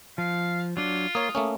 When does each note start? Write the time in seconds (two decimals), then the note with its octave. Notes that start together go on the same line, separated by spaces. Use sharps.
0.18 F3 F5
0.77 F#3 D4 F4
1.15 A#3 C#5 D#6
1.35 A3 A#3 C#4